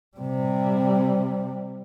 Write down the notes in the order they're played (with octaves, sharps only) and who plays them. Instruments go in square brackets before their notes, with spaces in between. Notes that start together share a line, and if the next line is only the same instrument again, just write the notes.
[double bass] C3 G3